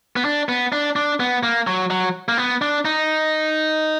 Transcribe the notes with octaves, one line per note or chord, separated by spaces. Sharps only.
B3
D4
B3
D4
D4
B3
A#3
F#3
F#3
A#3
B3
D4
D#4